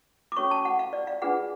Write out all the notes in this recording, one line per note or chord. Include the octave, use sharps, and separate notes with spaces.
D6
C#4 F#4 A4 C#5 C#6
A5
F#5
F5
D5
F5
D4 F4 G#4 B4 F#5